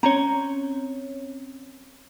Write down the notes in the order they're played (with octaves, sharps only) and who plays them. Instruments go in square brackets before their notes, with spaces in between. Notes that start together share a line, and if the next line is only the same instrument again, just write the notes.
[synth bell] C4 C#4 C#5 [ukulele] A#5